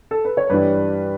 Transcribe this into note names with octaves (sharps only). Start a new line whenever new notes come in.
A4
B4
C#5
G2 E3 G3 B4 D5